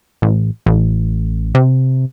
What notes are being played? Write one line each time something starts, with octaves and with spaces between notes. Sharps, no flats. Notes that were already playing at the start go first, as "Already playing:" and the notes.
A1
A1
C3